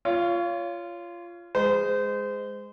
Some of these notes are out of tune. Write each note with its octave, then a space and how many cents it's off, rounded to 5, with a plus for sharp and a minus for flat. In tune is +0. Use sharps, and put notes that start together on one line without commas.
F4 -15 C#5 +20
G#3 -5 C5 -30